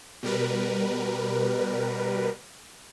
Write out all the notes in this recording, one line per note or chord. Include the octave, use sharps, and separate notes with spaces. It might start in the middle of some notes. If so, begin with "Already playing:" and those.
B2 G3 A#4 B4